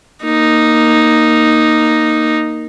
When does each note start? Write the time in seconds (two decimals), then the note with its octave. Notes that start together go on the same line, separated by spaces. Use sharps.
0.23 A#3 D#4